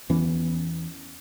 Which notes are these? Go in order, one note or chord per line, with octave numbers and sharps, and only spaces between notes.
E2 E3 B3 C#4